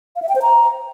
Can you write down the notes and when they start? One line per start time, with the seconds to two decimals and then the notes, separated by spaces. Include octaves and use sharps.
0.16 F5
0.22 E5
0.29 G5
0.35 C5
0.42 A#5